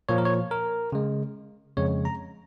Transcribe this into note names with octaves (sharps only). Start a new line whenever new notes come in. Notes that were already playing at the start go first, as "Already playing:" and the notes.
A#2 F3 A#3 C#5
A#4
C#5
A#4
C#3 G#3
F2 C#3 G#3 C#5
A#5